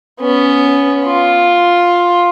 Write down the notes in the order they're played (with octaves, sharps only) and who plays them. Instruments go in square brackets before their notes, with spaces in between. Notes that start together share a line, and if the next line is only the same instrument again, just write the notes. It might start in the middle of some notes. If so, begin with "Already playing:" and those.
[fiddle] B3 C#4
F4